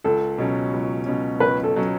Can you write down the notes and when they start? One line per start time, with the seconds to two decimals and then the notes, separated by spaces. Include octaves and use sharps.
0.04 C#2 A4
0.38 B2 F#3 C#4
0.73 C#2
1.06 B2 F#3 C#4
1.40 C#2 B4
1.63 A4
1.76 B2 F#3 C#4